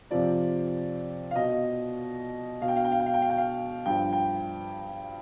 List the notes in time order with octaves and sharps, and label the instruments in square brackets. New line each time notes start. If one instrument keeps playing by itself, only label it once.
[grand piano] F2 C3 F3 D5
F5
B2 D#5
B2 F5
G5
F5
G5
F5
G5
F5
G5
F5
G5
F5
G2 F3 G5
G5